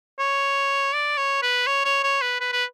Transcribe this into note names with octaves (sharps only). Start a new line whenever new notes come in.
C#5
D5
C#5
B4
C#5
C#5
C#5
B4
B4
B4